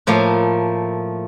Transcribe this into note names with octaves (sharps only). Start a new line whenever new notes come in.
A2 F3 A3 A#3